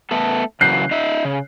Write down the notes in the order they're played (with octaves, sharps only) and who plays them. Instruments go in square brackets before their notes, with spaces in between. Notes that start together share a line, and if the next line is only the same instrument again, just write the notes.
[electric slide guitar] A3 B3 A4
[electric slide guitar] C#3 E3 F#3 [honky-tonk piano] F#6 G6 C7
[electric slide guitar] D#4 E5
C#3